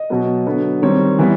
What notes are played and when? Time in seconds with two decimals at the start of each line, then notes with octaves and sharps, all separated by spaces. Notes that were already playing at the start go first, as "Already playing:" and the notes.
Already playing: D#5
0.10 B2 F#3 B3
0.47 D3 F#3 B3
0.82 D#3 G3 C4 C#5
1.19 E3 G3 B3